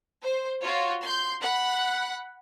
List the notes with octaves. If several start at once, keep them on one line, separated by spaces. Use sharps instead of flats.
C5
F4 F#4 C#5
C6 G6
F#5 B5 F#6